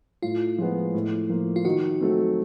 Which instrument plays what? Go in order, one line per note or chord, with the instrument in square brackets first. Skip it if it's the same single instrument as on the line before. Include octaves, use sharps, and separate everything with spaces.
[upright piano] A2 [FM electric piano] F4
[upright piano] F3 G#3 B3
A2
F3 A#3
[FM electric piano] F4
[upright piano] D#3 [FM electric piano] F#4
[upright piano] F#3 A3 C4